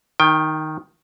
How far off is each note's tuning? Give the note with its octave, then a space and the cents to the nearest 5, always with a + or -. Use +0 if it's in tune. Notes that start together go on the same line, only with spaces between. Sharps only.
D#3 +0 G5 +20